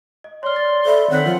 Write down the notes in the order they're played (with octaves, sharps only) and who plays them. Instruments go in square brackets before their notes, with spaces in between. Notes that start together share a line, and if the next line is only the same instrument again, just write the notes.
[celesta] D#5
[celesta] C#5 F6 [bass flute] D5 [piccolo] C6
[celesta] A6
[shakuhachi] A4 [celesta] C5 E5 B5
[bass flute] D#3 [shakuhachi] C4 [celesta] C#5 F#6 B6 [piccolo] F#5
[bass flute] F3 [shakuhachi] F4